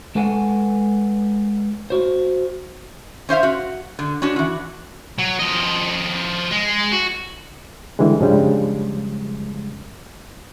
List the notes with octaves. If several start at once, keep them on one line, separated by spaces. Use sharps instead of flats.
G#3 A4 B4 F#5 G#5
F#4 C5
C#4 C5 E5 F5
F#4
D3
C#4 D4 F#4
E3 F#4
F#3
F3 D#5
G#3
F#4
D3 E3 G3 G#3
G2 C#3 F3 G3 G#3